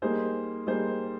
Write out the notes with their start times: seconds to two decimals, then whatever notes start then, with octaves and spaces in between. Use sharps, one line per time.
0.02 G3 A#3 D#4 G#4 C5
0.67 G3 A#3 D#4 G#4 C5